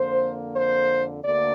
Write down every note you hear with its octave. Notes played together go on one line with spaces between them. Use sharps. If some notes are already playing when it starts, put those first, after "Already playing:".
Already playing: F2 D3 A#3 C5
C5
D2 D3 A#3 D5